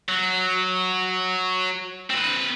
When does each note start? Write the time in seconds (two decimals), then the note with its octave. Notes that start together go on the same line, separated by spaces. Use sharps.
0.09 F#3
2.10 C4 B4